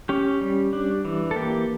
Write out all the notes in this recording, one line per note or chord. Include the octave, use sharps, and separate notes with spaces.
C#4 G4
G3
D4
E3
A4
A#3 G4